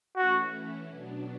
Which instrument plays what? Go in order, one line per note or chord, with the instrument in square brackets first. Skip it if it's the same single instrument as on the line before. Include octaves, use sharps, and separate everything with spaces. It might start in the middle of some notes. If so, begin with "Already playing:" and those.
[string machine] E3 A3 C#4 E4 [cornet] F#4
[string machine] B2 F#3 B3 D4